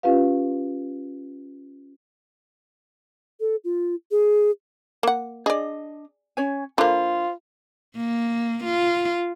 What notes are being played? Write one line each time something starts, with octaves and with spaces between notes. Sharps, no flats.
C#4 F4 G4 B4 F5
A4
F4
G#4
A#3 F#5
D4 G#4 D5 D#5
C#4 C#5 G#5
D3 A#3 F4 C5 B5
A#3
F4